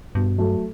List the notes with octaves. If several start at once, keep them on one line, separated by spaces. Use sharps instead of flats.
G2 B2
F#3 A3